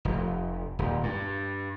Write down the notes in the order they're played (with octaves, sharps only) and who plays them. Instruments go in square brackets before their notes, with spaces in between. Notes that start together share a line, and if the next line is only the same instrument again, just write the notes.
[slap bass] F1
D#1
G2